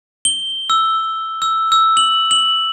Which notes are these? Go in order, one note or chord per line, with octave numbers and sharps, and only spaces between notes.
G7
E6
E6
E6
F#7
F#7